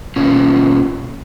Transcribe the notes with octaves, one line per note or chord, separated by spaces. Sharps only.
B2 A#3 C#4 F4